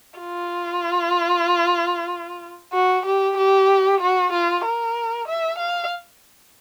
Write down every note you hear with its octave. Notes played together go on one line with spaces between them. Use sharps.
F4
F#4
G4
G4
F#4
F4
A#4
E5
F5